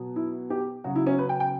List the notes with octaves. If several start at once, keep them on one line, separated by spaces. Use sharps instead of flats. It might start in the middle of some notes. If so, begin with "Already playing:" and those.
Already playing: B2 F#3
E4
G4
C#3 F#3 F#4
E4
C#4
B4
G5
G5